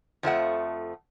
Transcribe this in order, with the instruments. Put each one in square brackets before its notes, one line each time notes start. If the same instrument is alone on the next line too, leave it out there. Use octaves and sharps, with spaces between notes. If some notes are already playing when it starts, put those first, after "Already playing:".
[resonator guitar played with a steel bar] F2 F3 A3 F#5